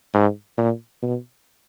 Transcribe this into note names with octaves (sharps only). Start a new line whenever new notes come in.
G#2
A#2
B2